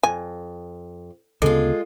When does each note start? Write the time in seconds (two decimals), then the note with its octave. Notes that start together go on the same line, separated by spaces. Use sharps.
0.03 F2 G#5
1.42 D2 C#3 G#3 B3 F4 A4